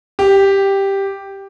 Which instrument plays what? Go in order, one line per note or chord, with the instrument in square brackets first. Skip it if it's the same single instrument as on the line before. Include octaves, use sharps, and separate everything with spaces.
[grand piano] G4